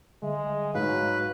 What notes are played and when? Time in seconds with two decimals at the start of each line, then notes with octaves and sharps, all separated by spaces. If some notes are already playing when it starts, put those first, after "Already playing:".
0.22 D3 G3 G#3 E5
0.75 G#2 F#3 B4 F5